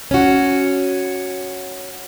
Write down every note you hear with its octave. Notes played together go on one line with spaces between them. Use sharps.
C#4 F#4